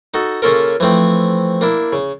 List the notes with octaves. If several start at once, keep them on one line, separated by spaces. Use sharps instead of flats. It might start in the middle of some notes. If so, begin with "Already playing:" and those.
D#4 F#4 A4
C#3 A#3 C#4 F4 A4 A#4
E3 F3 A3 C4
A#3 D4 E4
C#3